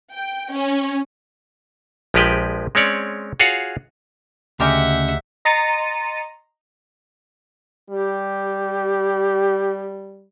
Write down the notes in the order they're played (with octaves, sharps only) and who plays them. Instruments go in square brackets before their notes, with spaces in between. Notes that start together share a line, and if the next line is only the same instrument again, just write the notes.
[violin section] G5
C#4
[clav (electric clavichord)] A#1 F3 G#3 G4 B4 G5
G#3 C4 C#4 C#5 D5
F4 F#4 G#4 C#5 F5 F#5
[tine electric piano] D2 [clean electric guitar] C#3 [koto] G#3 G4 A#4 [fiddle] E5 F#5
[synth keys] D#5 A#5 C6 A6 C#7 D#7
[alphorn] G3 [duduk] G4